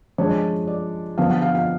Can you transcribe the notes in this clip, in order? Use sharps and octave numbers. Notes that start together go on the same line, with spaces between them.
F3 G#3 D4 C#5
D5
D3 F3 B3 D4 F5
F#5
F5
F5